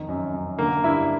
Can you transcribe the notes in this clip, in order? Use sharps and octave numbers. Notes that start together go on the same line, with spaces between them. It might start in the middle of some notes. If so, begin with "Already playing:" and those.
Already playing: F2 D#3
F#2
F#2
D3 A#3
G2 E4